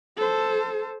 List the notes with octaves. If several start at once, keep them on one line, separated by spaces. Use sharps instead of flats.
A4 C5